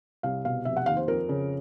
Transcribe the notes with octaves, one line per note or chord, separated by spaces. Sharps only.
C2 F5
B2 F5
F1 E5
F#5
D#2 F5
C5
F2 A#4
C#3